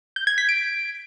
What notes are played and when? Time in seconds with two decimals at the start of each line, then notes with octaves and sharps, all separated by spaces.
0.16 G6
0.27 G#6
0.38 B6
0.49 D7